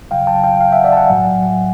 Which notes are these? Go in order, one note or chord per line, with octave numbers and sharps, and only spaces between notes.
C#3 F#3 F5 G5
G5 A5
F5 G5
F5 G5
E5 F#5
D5 E5
A5
F#5 G#5
A2 F#3